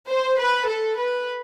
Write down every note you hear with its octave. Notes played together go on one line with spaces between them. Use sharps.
C5
B4
A4
B4